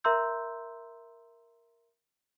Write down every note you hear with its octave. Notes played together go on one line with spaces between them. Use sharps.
A#4 E5 A#5 C6 E6 G6